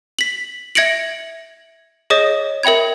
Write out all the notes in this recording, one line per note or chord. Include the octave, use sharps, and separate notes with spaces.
B6 F#7
E5 G#6 A#6 C#7 D7 F#7
G#4 C#5 D#5 D#6 A#6
A#4 E5 G5 B5 G#6